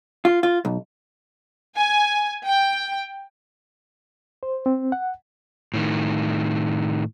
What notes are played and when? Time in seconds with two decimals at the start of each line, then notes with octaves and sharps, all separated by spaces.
0.25 F4
0.43 F4
0.65 B1
1.76 G#5
2.46 G5
4.43 C5
4.66 C4
4.92 F#5
5.74 A2 D#3